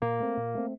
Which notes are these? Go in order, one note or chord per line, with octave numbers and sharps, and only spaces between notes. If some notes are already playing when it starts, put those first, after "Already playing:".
A#2 A#3
A3 C4
A#2
A3 C4